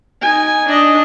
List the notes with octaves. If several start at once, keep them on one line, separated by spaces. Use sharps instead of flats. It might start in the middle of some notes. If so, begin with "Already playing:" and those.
D#4 G#5
D4 D#5